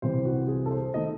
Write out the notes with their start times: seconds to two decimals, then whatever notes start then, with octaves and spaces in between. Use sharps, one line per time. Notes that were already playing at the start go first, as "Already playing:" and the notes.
0.02 C2 C3 E3 C5
0.25 F#4
0.48 G#4
0.66 A4
0.71 C5
0.94 D#3 A3 D#5